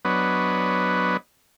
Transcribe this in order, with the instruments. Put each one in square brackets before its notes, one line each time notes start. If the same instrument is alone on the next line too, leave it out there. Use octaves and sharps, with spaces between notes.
[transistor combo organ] F#3 B3 D4 B4 C#5 D#5